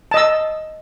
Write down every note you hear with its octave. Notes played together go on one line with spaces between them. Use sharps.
D#5 A5 E6